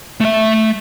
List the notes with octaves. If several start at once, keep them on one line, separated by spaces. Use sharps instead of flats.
A3 E5